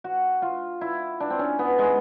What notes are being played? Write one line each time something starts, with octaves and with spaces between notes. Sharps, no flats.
F#4
F4
E4
D4
C4
C#4
B3
G#3